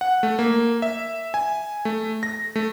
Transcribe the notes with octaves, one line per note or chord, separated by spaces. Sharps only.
F#5
A3
A#3
E5
G#5
A3
A#6
A3